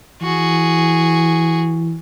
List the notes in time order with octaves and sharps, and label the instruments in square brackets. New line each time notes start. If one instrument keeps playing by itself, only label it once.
[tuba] E3 [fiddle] F#4 G#4